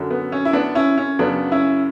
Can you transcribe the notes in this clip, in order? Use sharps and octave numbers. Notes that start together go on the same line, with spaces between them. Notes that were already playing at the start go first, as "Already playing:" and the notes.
Already playing: F#2 D3 F#3
B3
C#4
E4
B3 D4
C#4 E4
C#4
F#2 C#3 F#3 B3 D4
C#4 E4